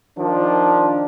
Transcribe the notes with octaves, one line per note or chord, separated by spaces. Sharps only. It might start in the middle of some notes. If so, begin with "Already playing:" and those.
D#3 F3 D4